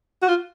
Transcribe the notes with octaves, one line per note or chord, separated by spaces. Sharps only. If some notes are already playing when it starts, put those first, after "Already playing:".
F#4
F4